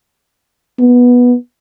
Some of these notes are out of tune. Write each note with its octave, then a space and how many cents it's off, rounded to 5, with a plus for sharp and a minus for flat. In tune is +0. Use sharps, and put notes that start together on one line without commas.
B3 -10